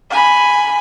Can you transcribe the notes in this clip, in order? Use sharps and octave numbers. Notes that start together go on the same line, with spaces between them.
G#5 B5